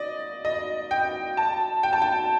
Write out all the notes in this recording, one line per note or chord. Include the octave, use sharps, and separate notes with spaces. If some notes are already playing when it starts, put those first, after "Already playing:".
Already playing: D5 D#5
D#5
G5
A5
G5
A5
G5